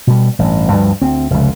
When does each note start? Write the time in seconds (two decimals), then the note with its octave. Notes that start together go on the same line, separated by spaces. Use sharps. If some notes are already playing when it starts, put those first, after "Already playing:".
0.07 B2 G3
0.39 A1 G2
0.71 D2 G2 F3
1.02 D2 C4
1.30 F1 C#2